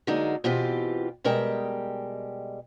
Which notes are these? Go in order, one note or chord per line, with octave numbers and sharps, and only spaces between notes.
D3 F#3 G#3 A#3 D#4
B2 E3 C4 F4 G4
B2 G3 G#3 A#4 G5 A5